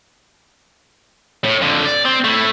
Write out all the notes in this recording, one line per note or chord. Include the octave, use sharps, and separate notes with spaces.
A2
F2 D3
D5
C4
A3 E4